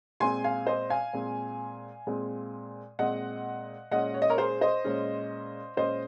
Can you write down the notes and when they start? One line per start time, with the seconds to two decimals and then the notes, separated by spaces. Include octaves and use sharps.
0.20 A#2 G#3 C4 G#5 C6
0.44 F5 G#5
0.67 C5 D#5
0.90 F5 G#5
1.13 A#2 G#3 C4
2.07 A#2 G#3 C4
2.99 A#2 G#3 C4 D#5 F#5
3.91 A#2 G#3 C#4 D#5 F#5
4.14 C#5
4.22 D#5
4.30 A#4 C#5
4.38 G#4 C5
4.61 C5 D#5
4.84 A#2 G#3 C#4
5.76 A#2 G#3 C#4 C5 D#5